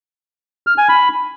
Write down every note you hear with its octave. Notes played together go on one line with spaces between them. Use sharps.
F6
G#5
B5